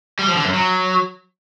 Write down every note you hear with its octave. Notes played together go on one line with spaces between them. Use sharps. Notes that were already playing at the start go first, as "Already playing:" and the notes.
G3
F3
D3
F#2
F#3